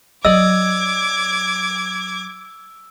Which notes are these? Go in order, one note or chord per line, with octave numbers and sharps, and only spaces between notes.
F#3 D5 D#5 D6 E6 G#6